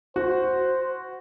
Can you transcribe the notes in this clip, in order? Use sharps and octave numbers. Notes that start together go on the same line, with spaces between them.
F#4 C5